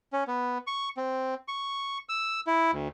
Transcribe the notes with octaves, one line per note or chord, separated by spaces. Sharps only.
C#4
B3
C#6
C4
C#6
E6
E4
D2